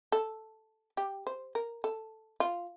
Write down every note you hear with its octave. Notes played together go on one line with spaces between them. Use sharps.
A4
G4
C5
A#4
A4
F4